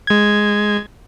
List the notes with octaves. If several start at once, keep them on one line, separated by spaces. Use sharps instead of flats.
G#3 G#6